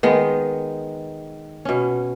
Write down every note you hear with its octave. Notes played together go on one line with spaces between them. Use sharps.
D#3 G#3 B3
B2 C#4